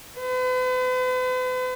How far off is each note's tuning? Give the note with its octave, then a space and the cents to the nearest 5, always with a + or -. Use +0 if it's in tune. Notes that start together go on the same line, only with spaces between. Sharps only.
B4 +45